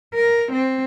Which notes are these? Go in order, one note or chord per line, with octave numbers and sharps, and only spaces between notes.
A#4
C4